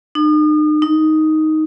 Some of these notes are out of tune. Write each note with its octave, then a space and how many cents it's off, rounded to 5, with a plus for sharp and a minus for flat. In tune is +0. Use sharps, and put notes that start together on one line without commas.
D#4 -40
D#4 +5